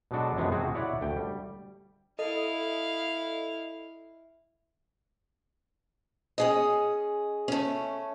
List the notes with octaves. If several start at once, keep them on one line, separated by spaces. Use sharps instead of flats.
B2 F#3 G#3 D4 F#4 A4
F#2 F3 G#3 B3
C3 F3 C4 F#4 G#4
E4 C#5 D5 F#5
D2 G5
G3
E4 A4 D#5 F5
C#4 G#4 D#5
A3 C#4